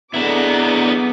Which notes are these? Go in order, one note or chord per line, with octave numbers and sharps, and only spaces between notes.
F#3 B3 D4 E4 G#4 A4 A#5 D6